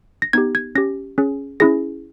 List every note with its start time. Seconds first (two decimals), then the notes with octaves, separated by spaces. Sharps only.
0.22 A#6
0.33 B3 D#4 G4 G#6
0.55 G#6
0.75 C#4 G4 A#6
1.18 C#4 G#4
1.60 C#4 E4 G#4 A#6